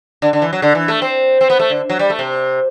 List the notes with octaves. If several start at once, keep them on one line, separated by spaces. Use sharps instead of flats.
D3
D3
E3
F#3
D3
E3
A3
C4
C4
B3
A3
D3
F#3
G3
A3
C3